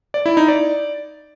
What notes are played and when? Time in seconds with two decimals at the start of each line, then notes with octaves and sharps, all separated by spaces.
0.14 D5
0.26 E4
0.37 D#4
0.48 D5